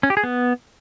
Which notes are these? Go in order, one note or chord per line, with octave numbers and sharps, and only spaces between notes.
C#4
G4
G#4
B3